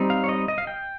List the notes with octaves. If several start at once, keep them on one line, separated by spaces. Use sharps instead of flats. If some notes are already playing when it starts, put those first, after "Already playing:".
Already playing: G3 C4 D#4
F5
C#5
D#5
D#5
F5
G5